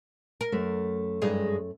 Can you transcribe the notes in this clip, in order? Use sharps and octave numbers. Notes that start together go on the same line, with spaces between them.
A#4
F#2 A3
G2 G#3 D#4